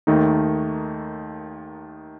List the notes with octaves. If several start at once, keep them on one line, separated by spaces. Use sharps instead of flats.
D#2 D#3 A3 D#4